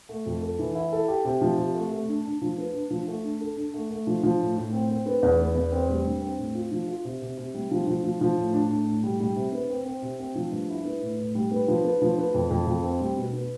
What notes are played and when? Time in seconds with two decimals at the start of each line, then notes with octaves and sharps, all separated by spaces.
0.09 A3
0.26 F2
0.42 A4
0.59 E3
0.75 E4
0.93 A4
1.08 G4
1.25 C3
1.41 F3
1.58 C3
1.75 A3
1.91 A3
2.08 D4
2.25 D4
2.42 F3
2.58 B3
2.74 D4
2.91 F3
3.07 A3
3.24 D4
3.41 A4
3.57 D4
3.74 A3
3.90 A3
4.07 F3
4.23 F3
4.40 A2
4.56 A2
4.73 C4
4.90 C4
5.06 B3
5.23 E2
5.39 B3
5.55 E2
5.72 C4
5.89 G3
6.05 G2
6.22 C4
6.38 A2
6.55 F4
6.72 F3
6.88 F4
7.05 C3
7.22 C3
7.38 C3
7.54 G3
7.71 F3
7.87 F3
8.04 F3
8.21 F3
8.37 A2
8.54 D4
8.71 A2
8.87 A2
9.03 G3
9.20 G3
9.36 C3
9.52 B3
9.70 C4
9.85 C4
10.02 C3
10.20 C4
10.35 F3
10.52 G2
10.69 E4
10.85 B3
11.01 A2
11.19 A2
11.35 G3
11.51 B3
11.68 F3
11.85 B3
12.02 F3
12.18 B3
12.34 F2
12.51 F2
12.67 F2
12.84 C4
13.00 G3
13.17 B2
13.33 B3